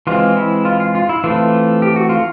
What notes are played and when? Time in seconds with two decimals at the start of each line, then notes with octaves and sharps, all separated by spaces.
0.07 E3 G#3 C4 F4
0.37 E4
0.65 F4
0.80 F4
0.95 F4
1.09 E4
1.24 E3 A3 C4 F4
1.82 G4
1.96 F#4
2.09 F4